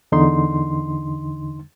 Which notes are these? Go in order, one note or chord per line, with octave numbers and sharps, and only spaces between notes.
E2 D3 D#4 C6